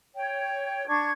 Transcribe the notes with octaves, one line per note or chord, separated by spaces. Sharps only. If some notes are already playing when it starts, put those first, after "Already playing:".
C#5 G5
D4 C#6 G#6